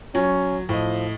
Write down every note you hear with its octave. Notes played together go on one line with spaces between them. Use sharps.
F#3 C#4
A2 F3 D#5